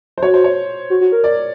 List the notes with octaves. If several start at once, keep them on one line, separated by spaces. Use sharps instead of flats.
C5
F#4 C#5
C5
C#5
F#4
F#4
A#4
D5